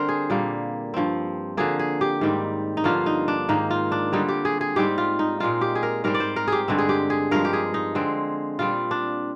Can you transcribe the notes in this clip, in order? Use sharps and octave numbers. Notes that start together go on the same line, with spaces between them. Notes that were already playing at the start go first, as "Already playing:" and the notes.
Already playing: D3 G3 C4 A#4 C5
G#4
A#2 G3 A#3
G2 F3 C4
D3 F3 A#3 G#4
G#4
G4
G#2 D#3 G3 C4
D#4
G2 D3 F3 A#3 F4
D#4
D4
G#2 D#3 A#3 D#4
F4
D4
D3 G3 C4 D#4
G4
G#4
G#4
G#2 G3 C4 G4
F4
D#4
A#2 G#3 C4 F4
G4
G#4
A#4
G#2 G3 C4 A#4
D5
C5
A#4
G4 G#4
G2 D3 G#3 C4
G#4
G4
G#4
G2 F3 G#3 A#4
G4
G#4
D#4
D3 G#3 C4
A#2 G3 C4 F4
D4